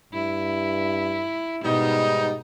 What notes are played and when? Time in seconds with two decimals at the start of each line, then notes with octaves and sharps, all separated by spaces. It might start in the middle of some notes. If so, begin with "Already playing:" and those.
0.13 G2 E4
1.64 G#2 B2 G3 B3 D#4